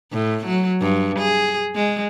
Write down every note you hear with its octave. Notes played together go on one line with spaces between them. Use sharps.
A2
F#3
G2
G#4
G#3